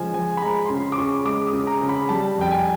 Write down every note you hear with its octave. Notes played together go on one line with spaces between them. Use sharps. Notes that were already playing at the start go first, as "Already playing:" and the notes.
Already playing: C#3 F3 G#3 G#5
F3 G#5
B5
G#3 A#5
C6
C#3 B5
D6
C#3 C#6
G#3 D6
D#6
C#3
A#5
C#3
B5
G3 A5
F2 G5
G#5